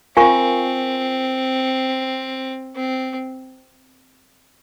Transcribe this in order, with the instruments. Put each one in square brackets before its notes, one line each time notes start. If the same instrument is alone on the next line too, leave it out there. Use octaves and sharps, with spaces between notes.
[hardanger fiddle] C4 [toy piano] F4 A#4 F5 G#5 C#6
[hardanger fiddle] C4